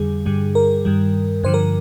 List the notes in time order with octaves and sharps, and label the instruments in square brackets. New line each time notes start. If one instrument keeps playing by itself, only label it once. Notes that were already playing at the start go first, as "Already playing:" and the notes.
Already playing: [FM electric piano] F2 D3 G3 G#4
G2 D3 G3
A#4
G2 D#3 G3
G2 D3 F3 C5
A#4